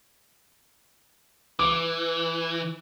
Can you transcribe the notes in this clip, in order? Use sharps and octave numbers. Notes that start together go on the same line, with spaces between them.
E3 D6